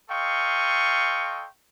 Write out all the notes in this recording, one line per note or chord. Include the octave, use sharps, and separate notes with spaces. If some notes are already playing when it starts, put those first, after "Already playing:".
A4 D#5 F5 G5 C6 C#6